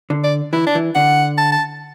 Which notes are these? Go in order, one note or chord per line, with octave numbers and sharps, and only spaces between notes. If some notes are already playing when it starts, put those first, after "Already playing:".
D3
D5
E3 E4
D4
E3
D3 F#5
A5
A5